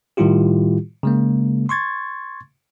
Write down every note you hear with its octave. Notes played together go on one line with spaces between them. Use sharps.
A2 D#3 G3 E4 F4 G4
C#3 G#3 A#3
C6 C#6 G#6 A6